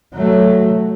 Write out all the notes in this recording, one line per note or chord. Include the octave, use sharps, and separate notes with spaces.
F#3 A3